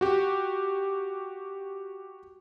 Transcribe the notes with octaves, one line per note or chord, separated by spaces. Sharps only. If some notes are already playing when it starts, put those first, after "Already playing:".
F#4 G4